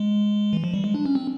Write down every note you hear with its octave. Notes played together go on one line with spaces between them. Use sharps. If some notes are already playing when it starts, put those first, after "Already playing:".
Already playing: G#3
E3
F3
G3
G#3
D4
C#4
C4